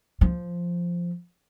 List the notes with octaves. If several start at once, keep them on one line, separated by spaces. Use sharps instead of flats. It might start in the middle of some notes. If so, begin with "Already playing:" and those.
F3